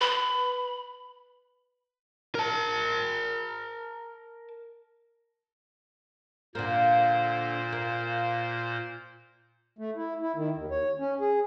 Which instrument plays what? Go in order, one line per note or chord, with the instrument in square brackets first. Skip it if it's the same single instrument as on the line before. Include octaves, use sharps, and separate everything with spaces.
[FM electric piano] B4 [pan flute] B5
[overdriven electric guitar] A#4 A5
[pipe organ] A#2 C5 [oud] D3 A#3
[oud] A#3
[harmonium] A3
E4
E4
D#3
D#2
C#5
C#4
G#4